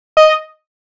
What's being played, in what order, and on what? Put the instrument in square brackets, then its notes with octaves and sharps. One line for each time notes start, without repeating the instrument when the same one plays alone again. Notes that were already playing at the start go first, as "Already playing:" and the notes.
[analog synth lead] D#5